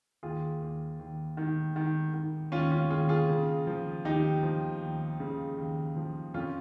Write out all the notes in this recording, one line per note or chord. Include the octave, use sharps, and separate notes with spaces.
D#2 F4 G#4
D#2
D#2
D#3
D#3
D#3
D#2 C#4 F4
C#4 F4
D#2 F4 G#4
F4 G#4
C#3
F3
D#2 D#4 G4
F3
D#2
C#3
D#2
F3
F2 C#4 F4